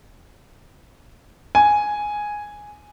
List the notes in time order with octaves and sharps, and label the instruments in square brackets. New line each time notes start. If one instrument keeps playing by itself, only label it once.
[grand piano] G#5